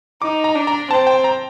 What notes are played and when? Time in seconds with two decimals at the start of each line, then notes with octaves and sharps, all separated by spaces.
0.22 D#4 D6
0.44 A#5
0.55 D4
0.67 A#5
0.90 C4 A5
1.07 G5
1.24 A#5